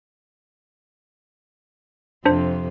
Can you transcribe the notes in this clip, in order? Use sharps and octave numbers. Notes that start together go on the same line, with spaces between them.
F2 C3 D4 C5